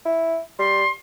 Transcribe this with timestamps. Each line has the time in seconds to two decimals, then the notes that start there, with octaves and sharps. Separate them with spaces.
0.05 E4
0.59 G3 C6